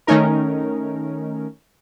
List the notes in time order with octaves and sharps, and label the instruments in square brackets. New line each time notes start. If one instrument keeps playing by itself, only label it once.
[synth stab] D#3 A3 C#4 D#4 A#4